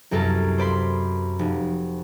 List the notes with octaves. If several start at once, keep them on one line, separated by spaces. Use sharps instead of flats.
C2 F#2 A4 A#4 A6
C5 D5 B5 C6
F1